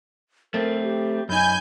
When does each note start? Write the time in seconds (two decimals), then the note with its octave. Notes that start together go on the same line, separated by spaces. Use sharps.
0.54 A3 C4 A#4
0.83 G4
1.29 F#2 D#4 G#5 B5 G6